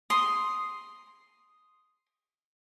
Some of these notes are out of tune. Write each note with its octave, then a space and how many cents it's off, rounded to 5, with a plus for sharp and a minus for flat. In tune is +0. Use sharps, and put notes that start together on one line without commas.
C6 +0 D#6 +0